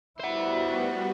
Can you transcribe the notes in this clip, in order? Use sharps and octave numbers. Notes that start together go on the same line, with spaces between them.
G3 B3 E4 F#4 C5 F#5